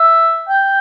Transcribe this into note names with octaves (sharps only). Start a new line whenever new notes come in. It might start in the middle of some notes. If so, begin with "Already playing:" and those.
Already playing: E5
G5